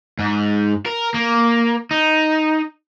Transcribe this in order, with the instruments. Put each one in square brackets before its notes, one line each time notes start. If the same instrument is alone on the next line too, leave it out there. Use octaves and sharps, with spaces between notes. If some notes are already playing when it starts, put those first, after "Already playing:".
[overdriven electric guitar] G#2
A#4
A#3
D#4